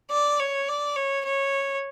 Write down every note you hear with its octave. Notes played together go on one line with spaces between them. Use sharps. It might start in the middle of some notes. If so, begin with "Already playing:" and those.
D5
C#5
D5
C#5
C#5